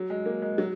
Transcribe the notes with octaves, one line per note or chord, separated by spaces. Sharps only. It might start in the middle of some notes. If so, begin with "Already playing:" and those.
Already playing: F#3
G#3
A#3
G#3
F#3